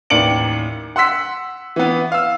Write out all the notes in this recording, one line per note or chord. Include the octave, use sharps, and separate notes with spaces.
A1 D#2 D5 C#7 D7 F#7
F#5 C6 E6 B6
E3 B3
F5 E6